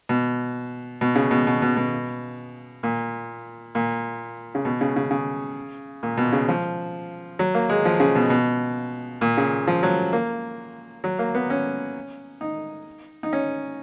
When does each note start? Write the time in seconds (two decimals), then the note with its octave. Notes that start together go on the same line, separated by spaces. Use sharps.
0.09 B2
1.01 B2
1.15 C#3
1.31 B2
1.47 B2
1.62 B2
1.77 B2
2.83 A#2
3.75 A#2
4.55 C#3
4.65 B2
4.81 C#3
4.96 C#3
5.11 C#3
6.03 A#2
6.18 B2
6.33 C#3
6.48 F3
7.39 F#3
7.55 A#3
7.69 G#3
7.85 F3
8.00 C#3
8.15 B2
8.30 B2
9.21 A#2
9.37 C#3
9.67 F3
9.83 F#3
10.13 A#3
11.04 F#3
11.19 A#3
11.35 B3
11.50 C#4
12.41 D#4
13.23 D#4
13.33 C#4